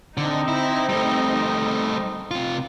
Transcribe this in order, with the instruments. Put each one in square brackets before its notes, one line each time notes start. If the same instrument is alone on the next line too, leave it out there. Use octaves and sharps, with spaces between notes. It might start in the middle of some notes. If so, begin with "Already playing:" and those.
[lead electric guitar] D3 [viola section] C4 D#4
[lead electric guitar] E4
G3 A3
C3 F4